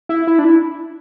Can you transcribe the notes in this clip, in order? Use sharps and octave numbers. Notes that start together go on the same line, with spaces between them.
E4
E4
D4
E4